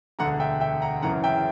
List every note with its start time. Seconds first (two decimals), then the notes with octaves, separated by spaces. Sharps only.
0.19 E1 D2 D3 F#5 A#5
0.40 E5 G5
0.60 E5 G5
0.82 F#5 A#5
1.02 F#1 F#2 C#3 E3 F#5 A#5
1.24 E5 G5